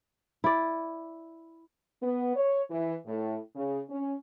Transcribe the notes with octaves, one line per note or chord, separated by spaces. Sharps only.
E4 D5
B3
C#5
E3
A2
C#3
C#4